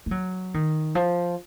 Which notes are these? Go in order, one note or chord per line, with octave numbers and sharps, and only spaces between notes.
A3
F#3
D#3
F3